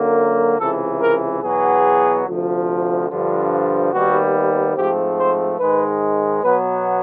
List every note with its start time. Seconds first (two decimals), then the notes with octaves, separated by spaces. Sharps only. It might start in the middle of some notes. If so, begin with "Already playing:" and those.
Already playing: F#2 D3 F#3 A#3
0.59 C#2 C3 E3 A4
1.01 A#4
1.42 E2 B2 F#3 B3 G#4
2.26 D2 C3 F3
3.09 G2 D3 F3
3.92 D#2 D#3 G3 B3 F#4
4.76 G#2 F3 A3 C4 G4
5.17 C5
5.59 G#2 D#3 G#3 B4
6.43 B2 F#3 B3 B4